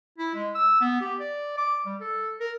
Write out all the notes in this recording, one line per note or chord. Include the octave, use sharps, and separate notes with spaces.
E4
G#3
E6
B3
G4
D5
D6
G3
A4
A#4